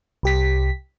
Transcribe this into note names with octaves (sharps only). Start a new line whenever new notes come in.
C2 G4 B6